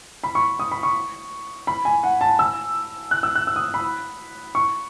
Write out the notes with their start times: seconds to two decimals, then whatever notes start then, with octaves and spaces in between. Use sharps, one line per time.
0.24 B5
0.35 C#6
0.59 D#6
0.71 B5
0.83 C#6
1.67 B5
1.85 G#5
2.03 F#5
2.21 A5
2.39 E6
3.11 F#6
3.23 E6
3.35 F#6
3.47 E6
3.56 D#6
3.74 B5
4.55 C#6